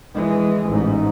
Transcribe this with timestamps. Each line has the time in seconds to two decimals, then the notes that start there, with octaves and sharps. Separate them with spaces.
0.14 E3 G#3
0.68 A1 G#2